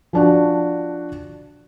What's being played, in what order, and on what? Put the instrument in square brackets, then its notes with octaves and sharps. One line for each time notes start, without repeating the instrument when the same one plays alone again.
[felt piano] F3 D4 F#4